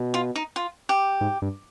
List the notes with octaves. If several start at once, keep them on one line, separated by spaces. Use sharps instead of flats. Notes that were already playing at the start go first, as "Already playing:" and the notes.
Already playing: B2
F4
D#4
F4
G4
G#2
G2